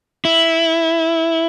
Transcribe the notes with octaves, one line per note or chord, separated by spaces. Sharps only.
E4